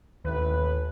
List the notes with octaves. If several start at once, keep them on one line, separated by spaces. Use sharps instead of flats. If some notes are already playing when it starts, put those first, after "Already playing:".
A1 D#2 A2 B4